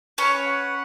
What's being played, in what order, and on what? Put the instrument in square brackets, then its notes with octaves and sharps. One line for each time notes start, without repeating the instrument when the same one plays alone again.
[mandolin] C#4 C#5 [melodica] B4
[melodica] F#5